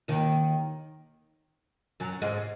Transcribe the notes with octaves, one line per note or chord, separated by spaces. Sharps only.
D#2 D#3
F#2 F#3
G#2 G#3